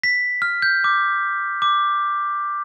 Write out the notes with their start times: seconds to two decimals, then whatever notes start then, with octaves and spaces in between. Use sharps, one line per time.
0.04 B6
0.42 F6
0.62 G6
0.84 D6
1.62 D6